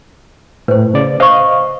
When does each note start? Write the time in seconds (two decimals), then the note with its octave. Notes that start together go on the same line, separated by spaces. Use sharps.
0.68 A2 B4 C5
0.94 C#3 D5
1.20 C5 D#5 F5 C#6